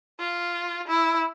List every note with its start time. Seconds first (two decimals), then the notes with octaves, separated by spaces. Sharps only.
0.20 F4
0.88 E4